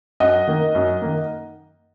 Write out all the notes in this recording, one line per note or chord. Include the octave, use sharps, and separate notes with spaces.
F#2 D#5 F#5
D#3 A#3
F#2
D#3 A#3